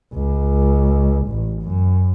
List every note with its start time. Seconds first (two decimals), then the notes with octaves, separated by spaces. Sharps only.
0.13 C#2
1.27 A1
1.63 F#2